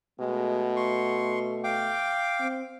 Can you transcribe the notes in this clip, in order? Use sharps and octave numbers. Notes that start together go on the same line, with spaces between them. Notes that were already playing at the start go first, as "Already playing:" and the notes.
B2 G#3 A3
C6 C#6
F5 G5 D6
C4